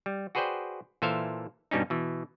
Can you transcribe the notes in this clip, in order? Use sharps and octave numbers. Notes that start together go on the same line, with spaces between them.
G3
F#4 G#4 B4 C5 D5 G5
A#2 E3 A4 C5 E5 F5
G2 B2 G3 C#4 D#4
B2 E3